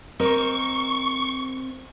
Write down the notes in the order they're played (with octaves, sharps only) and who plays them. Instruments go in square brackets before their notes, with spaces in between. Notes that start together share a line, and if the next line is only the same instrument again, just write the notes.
[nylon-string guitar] C4 A#4 D#5 [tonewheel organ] C#6